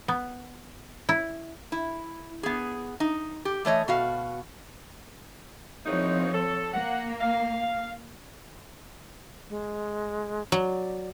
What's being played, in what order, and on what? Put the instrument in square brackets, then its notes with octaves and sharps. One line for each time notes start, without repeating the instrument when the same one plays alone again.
[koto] B3
E4
[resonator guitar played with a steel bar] E4
B3 G#4
D#4
G4
E3 A3 C#5 D#5
B2 F#4 F5
[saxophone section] E2 A#3 D#4 [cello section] F3 C4 C#5
[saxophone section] A4
[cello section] A#3 [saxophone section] F#5
[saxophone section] F5
[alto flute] G#3
[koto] F#3 [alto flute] D5